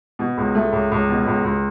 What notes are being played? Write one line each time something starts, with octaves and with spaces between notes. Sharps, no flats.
B2
C#2
A3
C#2
C#2
B2
C#2
C#2